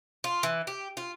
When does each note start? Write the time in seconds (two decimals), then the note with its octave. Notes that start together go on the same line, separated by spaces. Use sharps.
0.24 F4
0.43 E3
0.67 G4
0.97 F4